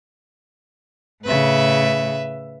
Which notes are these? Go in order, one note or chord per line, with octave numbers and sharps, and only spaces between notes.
A2 C#3 B4 E5